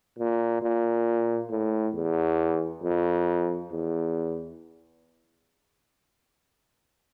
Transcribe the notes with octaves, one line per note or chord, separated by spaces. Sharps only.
A#2
A#2
A2
E2
F2
E2